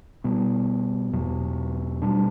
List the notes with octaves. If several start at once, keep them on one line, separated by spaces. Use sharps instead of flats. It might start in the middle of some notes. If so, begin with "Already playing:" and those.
B2 G3 B3
E2 B2 F#3
B2 G3 D4